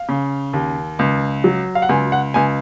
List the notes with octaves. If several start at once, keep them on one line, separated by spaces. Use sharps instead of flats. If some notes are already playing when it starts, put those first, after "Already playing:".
Already playing: F5
C#3
D#2
C#2
F#3
F5
F#5
C#2 G#5
F#5
C#2 G#5